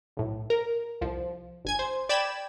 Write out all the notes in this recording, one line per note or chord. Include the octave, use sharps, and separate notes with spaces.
B1 A2
A#4
C2 F3
G1 G#5 G#6
C5
D5 G5 B5 G#6 E7